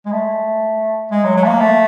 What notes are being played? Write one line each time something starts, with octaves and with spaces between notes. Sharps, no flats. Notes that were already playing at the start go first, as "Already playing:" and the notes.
G#3
A3
G#3
F#3
F#3
A3
A#3
A3